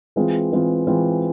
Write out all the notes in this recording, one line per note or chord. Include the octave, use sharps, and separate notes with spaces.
E3 G#3 C4 F4
E3 G#3 C4 F4
E3 G#3 C4 F4